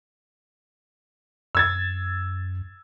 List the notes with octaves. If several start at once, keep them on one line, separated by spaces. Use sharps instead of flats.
F#2 E6 G#6 A6